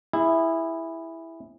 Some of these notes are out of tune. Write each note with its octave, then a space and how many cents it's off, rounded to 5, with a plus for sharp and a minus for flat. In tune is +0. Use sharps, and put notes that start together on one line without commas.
E4 +0 G#4 -25